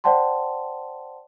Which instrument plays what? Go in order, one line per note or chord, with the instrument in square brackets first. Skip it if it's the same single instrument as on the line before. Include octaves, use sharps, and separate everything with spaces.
[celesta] C5 D5 F#5 G5 A5 C6